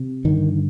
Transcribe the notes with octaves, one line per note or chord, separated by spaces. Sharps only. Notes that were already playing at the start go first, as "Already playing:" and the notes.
Already playing: C3
G2 D3 D#3